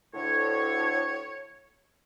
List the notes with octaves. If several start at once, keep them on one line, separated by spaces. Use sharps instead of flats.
D2 A2 D3 C#5